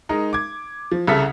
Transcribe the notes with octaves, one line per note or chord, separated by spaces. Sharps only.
G#3 D#4 A#4
D6 G#6
F3
C2 C#3 A4 E5 B6